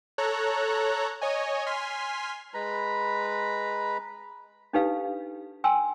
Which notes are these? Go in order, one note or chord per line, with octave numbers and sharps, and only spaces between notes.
A4 C#5 A#5 F#6
C#5 D#5 G#5
G#5 C6 F6 B6
G#3 B4 A#5 B5
D4 D#4 G4 A4 B4 F5
G5 G#5 C6 E6